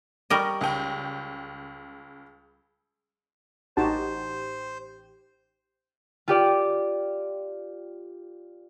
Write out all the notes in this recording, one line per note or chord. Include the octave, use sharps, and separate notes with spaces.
G3 A#4 D#5 C#6 A#6
C#2 G5
A1 D#4 F#4 G4 C5 A5
F4 G4 D5